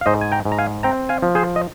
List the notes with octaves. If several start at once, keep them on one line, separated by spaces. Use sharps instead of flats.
F5
G#2 C5 D#5
G#5
G5 A#5
G#2
A#5
F5 G#5
C4 G5 A#5
F5 G#5
F3
G#4 C5
D#5